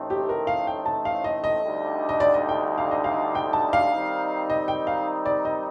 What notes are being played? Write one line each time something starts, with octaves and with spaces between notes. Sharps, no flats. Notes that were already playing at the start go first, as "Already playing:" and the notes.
Already playing: A1 A2 A3 C4 D#4
G4
A#4
F5
G5
A5
F5
D#5
D#5
D2 D3 G3 C4 D#4
D#5
D5
D#5
G5
F5
D#5
F5
G5
A5
F5
D#3 G3 C4 D#4
D#5
G5
F5
D5
D#5